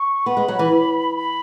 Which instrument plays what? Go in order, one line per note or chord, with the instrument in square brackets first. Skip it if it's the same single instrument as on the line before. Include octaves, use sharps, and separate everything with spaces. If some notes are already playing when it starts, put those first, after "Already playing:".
Already playing: [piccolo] C#6
[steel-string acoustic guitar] B3 [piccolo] B5
[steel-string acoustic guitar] G#3
F#3
E3
[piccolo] B5